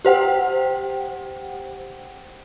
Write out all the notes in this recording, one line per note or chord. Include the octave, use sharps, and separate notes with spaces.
G4 C5 F#5 G5